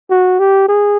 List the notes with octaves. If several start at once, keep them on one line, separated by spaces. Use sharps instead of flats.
F#4
G4
G#4